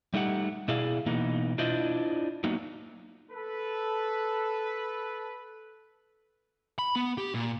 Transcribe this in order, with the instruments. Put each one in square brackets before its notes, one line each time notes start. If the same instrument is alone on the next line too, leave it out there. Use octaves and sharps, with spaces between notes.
[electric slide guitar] G3 A3 D#4 G4 F#5
B2 E4 G#4 D5 F5
B2 E3 A#3 B3 D#4
D4 E4 F4 C5 D5 D#5
F#3 A#3 B3 D#4
[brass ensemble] A4 B4
[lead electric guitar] B5
B3
G4
A#2